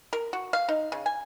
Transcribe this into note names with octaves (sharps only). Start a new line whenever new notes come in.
A#4
F#4
F5
D#4
C#3
G#5